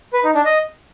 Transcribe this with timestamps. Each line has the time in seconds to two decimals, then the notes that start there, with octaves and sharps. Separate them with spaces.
0.13 B4
0.24 D#4
0.34 D4
0.45 D#5